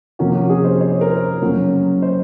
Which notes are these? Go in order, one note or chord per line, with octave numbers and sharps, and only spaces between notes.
C3 F3 A#3 C#4 F#4
F#4
G#4
C5
C#5
C5
A#4
C5
C#3 F#3 A#3 C#4
C5